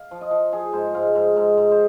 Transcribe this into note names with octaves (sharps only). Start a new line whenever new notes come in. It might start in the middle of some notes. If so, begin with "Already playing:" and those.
Already playing: F5
F3
D#5
F3
F3 G#4
G#2 C5
G#2 F5
G#2
G#2
G#2
C5